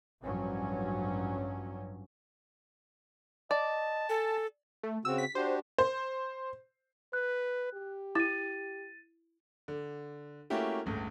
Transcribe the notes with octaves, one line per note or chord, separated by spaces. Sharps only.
A1 G2 F3 F#3 C#4
D5 D#5 A5
A4 G#5
A3
C#3 C4 F#4 E6
B6
D4 F#4 G4 C5
C5
B4 F#6
G4
E4 A6 D#7
D3
A3 A#3 C#4 E4 F#4 G4
G1 C#2 A2